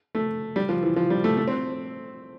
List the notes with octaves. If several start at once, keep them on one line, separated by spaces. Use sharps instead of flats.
A3
G3
F3
E3
F3
G3
A3
A3
C4